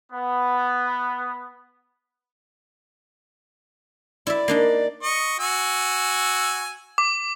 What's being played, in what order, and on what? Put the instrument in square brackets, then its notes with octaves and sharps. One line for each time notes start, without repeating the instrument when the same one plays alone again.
[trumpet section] B3
[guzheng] E4 E5 [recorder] D5
[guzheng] A#3 D4 D#4
[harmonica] D#5 C#6
F#4 G#5 E6
[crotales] D6